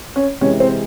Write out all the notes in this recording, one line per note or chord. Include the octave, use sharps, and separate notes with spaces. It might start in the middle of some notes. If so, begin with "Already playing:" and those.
C#4
C3 E3 G#3 C#4
C4